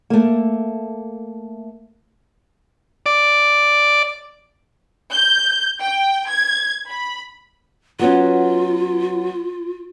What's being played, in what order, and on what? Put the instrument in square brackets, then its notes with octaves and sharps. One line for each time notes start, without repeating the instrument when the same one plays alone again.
[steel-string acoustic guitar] A3 A#3
[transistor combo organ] D5
[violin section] G6
G5
G#6
B5
[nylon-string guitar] F#3 B3 C#4 [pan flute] F4